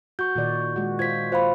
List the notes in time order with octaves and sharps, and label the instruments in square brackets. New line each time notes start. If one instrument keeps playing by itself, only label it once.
[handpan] F#4 [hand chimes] C#6 G6
[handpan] A#2 D#3 D5
G#3 F#4
[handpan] F4 C5 [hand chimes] G#6 B6
[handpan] F4 [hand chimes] C5 F5 B5